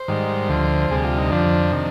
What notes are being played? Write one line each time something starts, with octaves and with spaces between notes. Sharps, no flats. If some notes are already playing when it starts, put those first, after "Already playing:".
Already playing: C5
G#2 D#3 G3
D2 D3 F3
D2 C3 G3 G#4
F4
D#4
F2 D3 F3 D4
C3 D#3